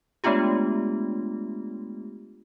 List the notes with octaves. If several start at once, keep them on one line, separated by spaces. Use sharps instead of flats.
G#3 A3 B3 D4 F4 G4